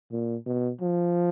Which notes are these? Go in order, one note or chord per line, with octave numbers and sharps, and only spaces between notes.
A#2
B2
F3